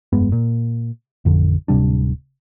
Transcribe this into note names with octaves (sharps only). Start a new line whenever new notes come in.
F1 G2 G#3 B3
A#2
A1 F2 D3
D1 C3 G3 D4